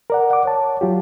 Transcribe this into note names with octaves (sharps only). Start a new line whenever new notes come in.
A#4 D5 F#5
F#5 D6
C#5 A5
F#3 F4 G4